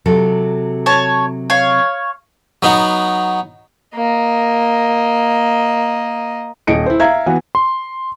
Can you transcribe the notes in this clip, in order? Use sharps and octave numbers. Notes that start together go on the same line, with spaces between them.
C3 F#3 A4
C#5 A5
C#5 F5
F#3 B3 D#4 F#4
A#3 D#5
D#1 D#5 C#7 D7
E4 C5
E5 F5 A#5 G#6
E3 B3 F#4
C6